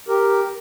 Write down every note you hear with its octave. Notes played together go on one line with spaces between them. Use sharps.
G4 A#4